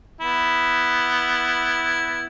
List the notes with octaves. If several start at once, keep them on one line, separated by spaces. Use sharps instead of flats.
B3 E4